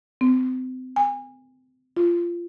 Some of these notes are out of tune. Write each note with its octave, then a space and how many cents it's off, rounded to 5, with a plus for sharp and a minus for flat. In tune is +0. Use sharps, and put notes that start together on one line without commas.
C4 -35
G#5 -30
F4 -15